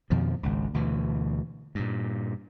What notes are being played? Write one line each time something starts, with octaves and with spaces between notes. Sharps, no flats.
F2 B2 D#3 F3
G#1 C#2
D2 B2 E3
G2 A#2